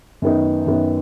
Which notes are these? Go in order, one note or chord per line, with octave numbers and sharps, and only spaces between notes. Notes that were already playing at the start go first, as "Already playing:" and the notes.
F#2 D#3 B3 D#4
F#2 D#3 B3 D#4